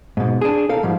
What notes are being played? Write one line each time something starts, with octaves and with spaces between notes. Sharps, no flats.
G#2 B2
D4 G#4
A4 A#4 F5
G#2 F3 G3